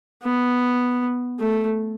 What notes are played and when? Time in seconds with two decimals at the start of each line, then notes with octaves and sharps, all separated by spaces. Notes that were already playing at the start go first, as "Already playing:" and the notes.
0.23 B3
1.39 A3